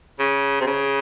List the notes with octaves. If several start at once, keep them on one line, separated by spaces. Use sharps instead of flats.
C#3
C3
C#3